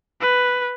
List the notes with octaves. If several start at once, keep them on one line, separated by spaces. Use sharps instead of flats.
B4